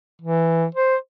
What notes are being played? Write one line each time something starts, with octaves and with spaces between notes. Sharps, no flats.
E3
C5